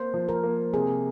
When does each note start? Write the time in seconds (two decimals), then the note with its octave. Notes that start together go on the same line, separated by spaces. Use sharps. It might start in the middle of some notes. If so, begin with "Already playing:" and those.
Already playing: A#3 C5
0.14 F3
0.29 A#4
0.43 A#3
0.73 C3 G#4